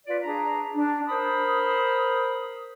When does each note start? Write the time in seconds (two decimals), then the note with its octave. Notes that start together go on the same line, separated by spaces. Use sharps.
0.06 F4 B4 D5
0.23 D4 G#4 A#5
0.75 D4
1.07 A#4 C5 B5 D#6